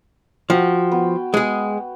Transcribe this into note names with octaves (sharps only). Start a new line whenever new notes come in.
F3 F#4 G5
B3
G#3 B3 G#4